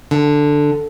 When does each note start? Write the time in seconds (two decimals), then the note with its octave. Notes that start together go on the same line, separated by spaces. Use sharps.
0.11 D3